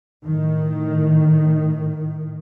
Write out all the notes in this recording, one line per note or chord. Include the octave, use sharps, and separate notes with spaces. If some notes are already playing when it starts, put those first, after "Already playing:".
A2 D#3